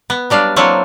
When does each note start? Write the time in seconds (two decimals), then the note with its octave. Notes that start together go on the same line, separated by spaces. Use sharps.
0.10 B3
0.30 F#3 G3 D4 F5
0.56 F#3 A#3 C4 D4 E4 C#5